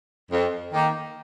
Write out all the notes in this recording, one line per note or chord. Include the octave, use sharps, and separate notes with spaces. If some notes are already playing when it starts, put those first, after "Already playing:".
F2
D#3 A#3